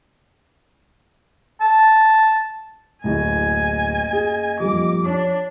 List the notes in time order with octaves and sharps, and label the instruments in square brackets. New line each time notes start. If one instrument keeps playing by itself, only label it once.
[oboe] A5
[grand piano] D1 A2 [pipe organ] F#2 A#3 D#5 [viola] G#5
[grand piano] G#4
[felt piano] A#1 F2 [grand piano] G3 [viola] D6
[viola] D4 [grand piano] C#5